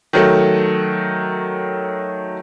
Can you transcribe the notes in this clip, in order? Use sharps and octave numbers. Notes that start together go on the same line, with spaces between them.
D#3 F#3 A3